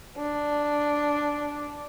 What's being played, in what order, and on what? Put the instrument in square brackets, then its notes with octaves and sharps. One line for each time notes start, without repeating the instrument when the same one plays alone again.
[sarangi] D4